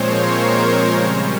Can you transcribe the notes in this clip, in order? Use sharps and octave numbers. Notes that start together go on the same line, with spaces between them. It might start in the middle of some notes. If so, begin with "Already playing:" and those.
Already playing: A#2 F3 G#3 C4 C5 C#5
A#4
C5
C#3 G3 C#4